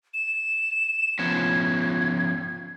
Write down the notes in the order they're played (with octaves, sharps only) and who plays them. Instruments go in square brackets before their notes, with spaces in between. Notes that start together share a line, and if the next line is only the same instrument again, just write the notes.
[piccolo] E7
[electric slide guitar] F3 B3 C#4 [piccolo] G#6